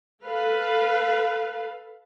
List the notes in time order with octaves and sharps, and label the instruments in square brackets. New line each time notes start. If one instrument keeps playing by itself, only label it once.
[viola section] A4 B4 F5